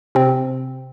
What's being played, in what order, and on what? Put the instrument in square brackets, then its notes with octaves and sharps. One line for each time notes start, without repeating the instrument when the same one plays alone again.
[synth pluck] C3 C4